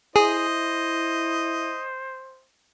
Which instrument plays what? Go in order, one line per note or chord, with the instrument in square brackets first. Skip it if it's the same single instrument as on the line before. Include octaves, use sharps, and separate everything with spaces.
[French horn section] E4 [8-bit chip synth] G#4 [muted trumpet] C5 [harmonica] D#5